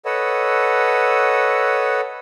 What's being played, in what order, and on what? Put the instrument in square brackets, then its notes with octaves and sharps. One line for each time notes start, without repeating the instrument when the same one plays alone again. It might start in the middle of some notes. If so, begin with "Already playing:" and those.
[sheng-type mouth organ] A4 B4 C#5 D#5 F#5 E6